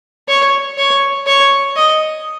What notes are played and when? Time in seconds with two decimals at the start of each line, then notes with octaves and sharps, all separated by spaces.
0.28 C#5
0.77 C#5
1.26 C#5
1.76 D#5